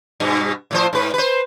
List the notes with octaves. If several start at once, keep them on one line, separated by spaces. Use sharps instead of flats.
G2 B2
A2 F3 C5
G#2 B4
B4 C5